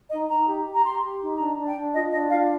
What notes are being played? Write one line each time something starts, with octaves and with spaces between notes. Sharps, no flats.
D#4 D#5
D#4 A#5
G4
G4
A#5
G4 C6
G4
D#4
D4 A#5
D4
G5
D4
F4 D#5
D4 D#5
F4 F5